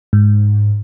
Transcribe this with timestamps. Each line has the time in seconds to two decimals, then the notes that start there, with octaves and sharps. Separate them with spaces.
0.13 G#2